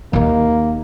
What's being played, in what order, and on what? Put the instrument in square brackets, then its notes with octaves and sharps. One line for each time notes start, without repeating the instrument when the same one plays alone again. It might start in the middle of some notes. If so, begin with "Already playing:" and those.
[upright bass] D#2 D#3 [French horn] A#3